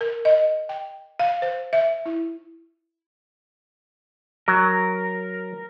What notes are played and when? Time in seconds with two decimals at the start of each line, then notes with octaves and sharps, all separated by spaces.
0.01 A#4
0.25 D#5
0.69 G5
1.20 F5
1.42 C5
1.73 E5
2.06 E4
4.48 F#3 A#4